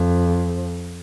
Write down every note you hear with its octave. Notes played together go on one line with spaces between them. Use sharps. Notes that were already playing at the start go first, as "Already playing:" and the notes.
Already playing: F2